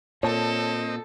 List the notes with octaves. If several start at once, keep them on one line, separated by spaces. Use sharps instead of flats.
A#2 C4 A4 C#5 D#5 A5